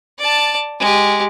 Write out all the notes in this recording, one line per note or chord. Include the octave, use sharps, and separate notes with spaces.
D5 A5
G#3 G4